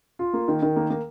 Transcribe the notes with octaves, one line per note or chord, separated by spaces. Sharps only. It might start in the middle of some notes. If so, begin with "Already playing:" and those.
F4
A#3
D#3
D#3
A#3
A#3